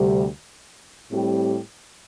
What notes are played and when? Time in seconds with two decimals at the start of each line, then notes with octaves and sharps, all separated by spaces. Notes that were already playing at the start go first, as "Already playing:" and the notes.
Already playing: D2 C3 G3
1.12 A2 G3 C4 G4